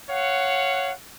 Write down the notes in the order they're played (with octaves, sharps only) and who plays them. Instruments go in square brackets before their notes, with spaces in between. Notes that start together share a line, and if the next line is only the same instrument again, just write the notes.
[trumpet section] C#5 F5 F#5